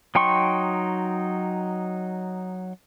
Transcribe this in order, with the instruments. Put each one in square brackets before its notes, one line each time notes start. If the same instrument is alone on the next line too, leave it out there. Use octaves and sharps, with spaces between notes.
[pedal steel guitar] F#3 D#4 G5 C6 C#6